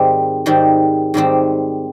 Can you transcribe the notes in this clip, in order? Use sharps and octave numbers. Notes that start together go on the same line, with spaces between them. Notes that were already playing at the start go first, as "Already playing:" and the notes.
Already playing: G#2 D#3 G3 C4
G#2 D#3 G3 C4
G#2 D#3 G3 C4